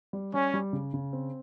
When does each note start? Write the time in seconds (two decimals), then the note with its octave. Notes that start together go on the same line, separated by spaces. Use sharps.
0.13 G3
0.34 G3 C#4
0.54 G3
0.73 C#3
0.94 C#3
1.13 C4